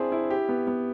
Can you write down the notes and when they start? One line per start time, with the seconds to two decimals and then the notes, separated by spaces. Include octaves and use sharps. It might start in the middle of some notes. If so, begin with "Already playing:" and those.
Already playing: C4 D4 E4 G#4
0.12 E4
0.30 G4
0.49 B3
0.67 B3